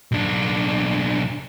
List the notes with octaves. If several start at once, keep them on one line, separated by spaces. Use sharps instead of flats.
B1 D4